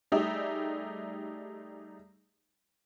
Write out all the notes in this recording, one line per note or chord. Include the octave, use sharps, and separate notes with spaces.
G3 A3 D#4 G4 G#4 E5